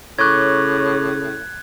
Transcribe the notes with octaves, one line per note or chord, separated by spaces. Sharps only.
A2 C#3 C#5 C#6 D6 F#6 G#6